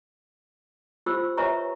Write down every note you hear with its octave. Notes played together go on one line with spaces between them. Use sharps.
F4 G4 C5 E6
G4 B4 C#5 E5 A#5 C#6